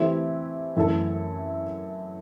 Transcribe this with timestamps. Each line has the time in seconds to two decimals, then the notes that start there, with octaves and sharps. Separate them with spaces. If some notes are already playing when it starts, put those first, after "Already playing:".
Already playing: E3 A3 C4 E4 G4
0.76 F#2 E3 A3 E4 A4